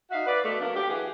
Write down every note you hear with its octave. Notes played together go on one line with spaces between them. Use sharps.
D#4 F#4 E5 F5
B4 D5
B2 A3
F#3 A#3 B3 D4
G4
E3 F#4 G#4